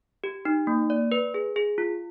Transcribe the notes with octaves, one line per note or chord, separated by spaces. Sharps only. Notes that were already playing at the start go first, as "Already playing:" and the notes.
G4
D#4
A#3
D5
B4
G#4
G#4
F4